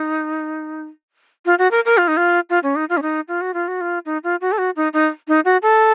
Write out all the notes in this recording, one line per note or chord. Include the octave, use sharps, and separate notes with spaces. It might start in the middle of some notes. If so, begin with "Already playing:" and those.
Already playing: D#4
F4
F#4
A#4
A#4
F4
D#4
F4
F4
C#4
D#4
F4
C#4
D#4
F4
F#4
F4
F#4
F4
D#4
F4
F#4
A4
F#4
D#4
D#4
D#4
F#4
A4